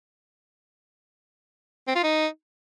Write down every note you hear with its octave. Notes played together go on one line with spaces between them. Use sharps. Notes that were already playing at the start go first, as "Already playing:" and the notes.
C4
F4
D#4